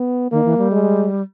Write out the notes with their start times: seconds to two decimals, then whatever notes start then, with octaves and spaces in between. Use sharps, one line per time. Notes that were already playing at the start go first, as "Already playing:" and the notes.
Already playing: B3
0.31 D#3 A#3
0.45 E3
0.58 G3
0.71 G#3